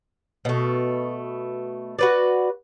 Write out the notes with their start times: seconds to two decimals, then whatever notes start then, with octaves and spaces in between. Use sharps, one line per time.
0.45 B2 A3
1.99 F#4 B4 D5